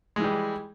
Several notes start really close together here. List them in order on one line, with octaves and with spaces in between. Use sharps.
G#3 E3 G3